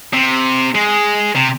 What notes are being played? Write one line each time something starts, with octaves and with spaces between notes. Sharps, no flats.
C3
G#3
C3